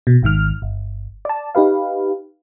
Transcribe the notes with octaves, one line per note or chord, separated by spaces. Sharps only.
B2
G#1 G#2 D#3 F6
G1
D5 A5
D#4 G4 B4 F5